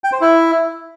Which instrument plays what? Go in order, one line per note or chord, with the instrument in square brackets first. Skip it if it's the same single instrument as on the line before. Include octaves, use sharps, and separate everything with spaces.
[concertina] G5
C5
E4